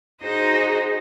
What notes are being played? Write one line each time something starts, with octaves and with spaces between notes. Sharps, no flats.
D#4 F#4 G#4 C5 D#5